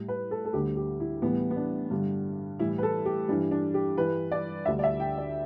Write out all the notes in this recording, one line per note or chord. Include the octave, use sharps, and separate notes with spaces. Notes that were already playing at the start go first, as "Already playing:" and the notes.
Already playing: A2 G3
B4
A4
A4
D2 D3 G3 G4
G4
E4
A2 E3 G3 B3
B3
D4
G2 D3 G3
A2 E3 G3 E4
B4
A4
G4
G2 E3 G3 D4
D4
G4
G2 E3 G3 B4
D5
D2 D3 G3 E5
D5
E5
G5
D5